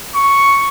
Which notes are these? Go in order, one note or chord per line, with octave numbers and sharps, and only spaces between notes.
C#6